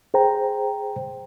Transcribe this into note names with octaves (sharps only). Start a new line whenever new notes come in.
G#4 C5 G5 A#5